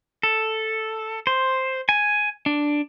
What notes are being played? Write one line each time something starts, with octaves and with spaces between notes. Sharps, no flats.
A4
C5
G#5
D4